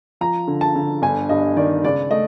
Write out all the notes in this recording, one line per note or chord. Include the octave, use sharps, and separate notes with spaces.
F3 A#5
D3
A5
D3
G1 G#5
G2 D#5
D#3 D5
C#2 D5
A3 D#5